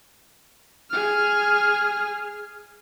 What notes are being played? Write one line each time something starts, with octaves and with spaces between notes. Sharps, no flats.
G#4 F6